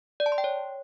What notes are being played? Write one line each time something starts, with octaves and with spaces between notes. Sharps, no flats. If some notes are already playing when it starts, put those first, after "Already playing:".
D5
A5
C6
G5
C#5